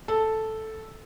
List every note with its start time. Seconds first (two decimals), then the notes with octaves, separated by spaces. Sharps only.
0.08 A4